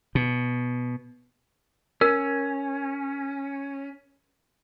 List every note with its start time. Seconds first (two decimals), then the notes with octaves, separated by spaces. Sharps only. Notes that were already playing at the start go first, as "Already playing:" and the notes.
0.15 B2
2.01 C#4 A#4